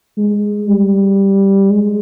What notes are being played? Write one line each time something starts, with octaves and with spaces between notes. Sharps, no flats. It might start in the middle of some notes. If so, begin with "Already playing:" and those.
G#3
G3
G#3